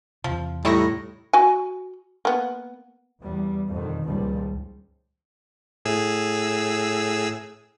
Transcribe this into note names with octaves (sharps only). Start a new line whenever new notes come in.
E2 C3 F3
A2 G3 D#4 E4 C#6 A#6
F#4 G#5
A#3 B3
E2 G3
F2 B2 D3 D#3
C#2 G2 A#2 D#3 F3 G3
A2 G#4 E6